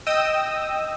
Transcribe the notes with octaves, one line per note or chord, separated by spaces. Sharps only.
D#5 G5 D#6 E6